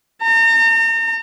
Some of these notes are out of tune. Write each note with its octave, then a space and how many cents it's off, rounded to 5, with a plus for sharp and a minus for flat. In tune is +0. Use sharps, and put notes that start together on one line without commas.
A#5 -40